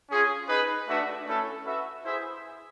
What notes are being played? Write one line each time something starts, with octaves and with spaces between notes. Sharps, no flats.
C#4 F4 G#4
D#4 G#4 B4
A3 D4 F#4 B4 E5
A3 C#4 E4 A4
F#4 B4 E5
E4 G#4 C5 E5